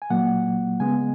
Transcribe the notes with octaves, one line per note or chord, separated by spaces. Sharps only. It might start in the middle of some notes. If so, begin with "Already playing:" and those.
G#5
A#2 F#3 A#3 F#5
C#3 G#3 B3 G#5